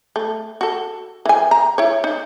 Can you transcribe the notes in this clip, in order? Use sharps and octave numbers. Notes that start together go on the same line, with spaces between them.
A3
F#4 A4
E3 G#5
A#5
E4 C#5
D#4